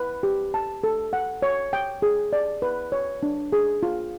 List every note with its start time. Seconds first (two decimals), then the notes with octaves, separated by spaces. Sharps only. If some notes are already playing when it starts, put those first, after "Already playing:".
Already playing: B4
0.23 G4
0.54 A5
0.84 A4
1.13 F#5
1.42 C#5
1.73 G5
2.02 G#4
2.33 D5
2.62 B4
2.92 C#5
3.23 D4
3.53 G#4
3.83 F4